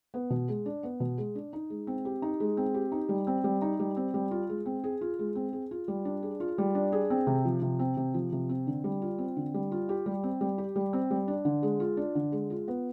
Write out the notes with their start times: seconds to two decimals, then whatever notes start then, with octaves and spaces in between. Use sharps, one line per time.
0.14 B3
0.30 B2
0.49 G#3
0.66 D4
0.83 B3
1.00 B2
1.18 G#3
1.35 D4
1.53 D#4
1.70 G#3
1.87 C4
2.05 G4
2.22 D#4
2.40 G#3
2.57 C4
2.74 G4
2.92 D#4
3.09 G3
3.27 C4
3.44 G3
3.62 D#4
3.79 G3
3.97 C4
4.14 G3
4.31 F4
4.49 G#3
4.66 C4
4.84 G#4
5.01 F4
5.19 G#3
5.35 C4
5.53 G#4
5.71 F4
5.88 G3
6.05 D4
6.22 G#4
6.40 F4
6.58 G3
6.75 D4
6.92 G#4
7.10 C4
7.27 C3
7.45 F3
7.62 C3
7.79 C4
7.97 C3
8.14 F3
8.32 C3
8.49 C4
8.67 D3
8.84 G3
9.02 F4
9.18 C4
9.36 D3
9.54 G3
9.72 F4
9.89 G4
10.06 G3
10.23 C4
10.41 G3
10.58 G4
10.76 G3
10.93 C4
11.11 G3
11.28 D4
11.45 D3
11.63 G#3
11.80 F4
11.97 D4
12.15 D3
12.32 G#3
12.50 F4
12.68 B3